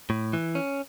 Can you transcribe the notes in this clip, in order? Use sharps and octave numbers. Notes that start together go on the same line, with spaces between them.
A2
E3
C#4